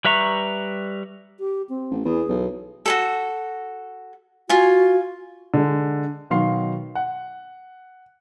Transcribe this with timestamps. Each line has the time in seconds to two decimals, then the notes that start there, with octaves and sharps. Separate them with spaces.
0.05 G3 B4 E5 A#5 C#6
1.39 G4
1.69 C4
1.91 A1
2.05 E2 G#4
2.29 B1
2.86 F#4 G#4 A4
4.49 F4 F#4 G#5
5.54 D3 G#3
6.30 B2 D#3 F#3 F5 C6 C7
6.95 F#5